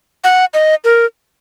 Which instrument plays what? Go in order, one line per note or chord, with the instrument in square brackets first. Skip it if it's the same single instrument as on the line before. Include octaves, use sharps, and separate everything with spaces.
[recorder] F#5
D#5
A#4